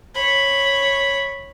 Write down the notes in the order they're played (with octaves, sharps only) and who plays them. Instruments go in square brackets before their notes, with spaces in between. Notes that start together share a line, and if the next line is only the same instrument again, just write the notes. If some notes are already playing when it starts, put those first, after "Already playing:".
[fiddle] C#5 B5